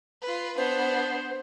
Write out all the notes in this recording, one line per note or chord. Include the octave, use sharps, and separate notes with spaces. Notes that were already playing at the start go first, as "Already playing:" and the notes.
F4 B4
B3 D4 C5